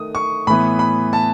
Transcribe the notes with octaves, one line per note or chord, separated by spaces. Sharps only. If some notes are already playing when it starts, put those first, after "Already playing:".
Already playing: D#3 A3 D#6
C#6
A2 E3 B3 B5
B5
A5